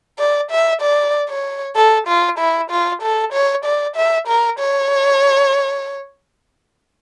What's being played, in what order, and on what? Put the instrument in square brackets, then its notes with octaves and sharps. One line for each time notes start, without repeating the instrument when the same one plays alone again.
[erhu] D5
E5
D5
C#5
A4
F4
E4
F4
A4
C#5
D5
E5
A#4
C#5